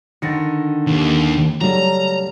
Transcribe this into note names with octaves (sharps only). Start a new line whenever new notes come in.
D3 D#3 A6 A#6 C#7
D#2
C#3 F#3 G3 A3 A#5